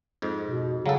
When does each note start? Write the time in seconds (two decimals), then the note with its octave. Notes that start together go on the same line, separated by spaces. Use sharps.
0.22 F2 G#2
0.46 B2
0.86 C#3 F#3 A4